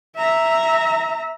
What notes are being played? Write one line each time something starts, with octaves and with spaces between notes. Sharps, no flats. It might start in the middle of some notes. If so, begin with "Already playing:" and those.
E5 A#5